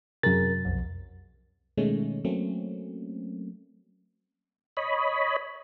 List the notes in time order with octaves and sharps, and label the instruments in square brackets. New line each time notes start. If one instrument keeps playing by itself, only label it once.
[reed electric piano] F#2 A6 [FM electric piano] C3 G#4 A#4
[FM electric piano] B1 F2
B2 D#3 G#3 A3 C#4
F#3 A3 A#3 C4 C#4
[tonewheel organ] C#5 D#5 B5